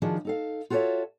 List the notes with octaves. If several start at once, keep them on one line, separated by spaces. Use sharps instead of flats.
D#3 F3 D4 F#4 G#4
D#4 A4 F5
F4 F#4 A4 A#4 C#5 E5